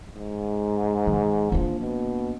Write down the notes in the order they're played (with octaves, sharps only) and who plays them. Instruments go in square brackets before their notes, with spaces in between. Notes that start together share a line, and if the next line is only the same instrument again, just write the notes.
[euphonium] G#2
[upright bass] D#3
[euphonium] F3 [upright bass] A#3 D4
[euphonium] B2